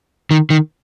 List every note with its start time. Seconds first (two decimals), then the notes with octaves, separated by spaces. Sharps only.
0.31 D#3
0.50 D#3